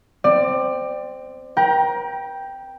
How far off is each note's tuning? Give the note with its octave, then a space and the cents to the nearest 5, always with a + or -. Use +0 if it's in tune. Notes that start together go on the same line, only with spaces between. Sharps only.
C4 -5 D5 +20
A#4 +45 G5 +0 A#5 +25